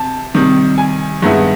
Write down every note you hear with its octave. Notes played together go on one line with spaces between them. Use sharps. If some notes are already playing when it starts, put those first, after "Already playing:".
Already playing: C3 A5
C3 D#3 G3
G#5
G2 D#3 G#3 B3 E4